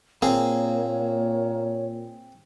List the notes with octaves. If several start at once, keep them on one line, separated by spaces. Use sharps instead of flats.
A#2 A#3 C4 G#4 C#5